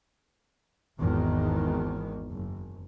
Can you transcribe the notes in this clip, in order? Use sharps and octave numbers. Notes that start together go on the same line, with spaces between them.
G#1 E2 D#3
F#1